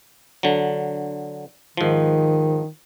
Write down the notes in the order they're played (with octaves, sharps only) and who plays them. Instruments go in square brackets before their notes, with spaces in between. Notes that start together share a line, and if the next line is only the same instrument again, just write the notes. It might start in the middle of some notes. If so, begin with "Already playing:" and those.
[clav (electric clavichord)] D3 F#3
[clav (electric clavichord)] G#2 F3 [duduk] D#3